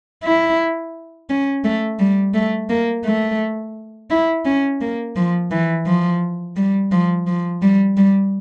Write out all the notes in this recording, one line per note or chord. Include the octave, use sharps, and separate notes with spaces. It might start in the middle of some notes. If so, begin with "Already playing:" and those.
E4
C#4
A3
G3
A3
A#3
A3
E4
C#4
A#3
F3
E3
F3
G3
F3
F3
G3
G3